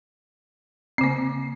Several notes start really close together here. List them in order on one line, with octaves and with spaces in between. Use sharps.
C4 C#3 A#3